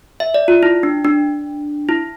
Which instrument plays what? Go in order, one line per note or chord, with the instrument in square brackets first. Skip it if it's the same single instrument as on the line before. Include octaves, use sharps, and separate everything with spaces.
[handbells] E5
D5
F4
E4
D4
D4
E4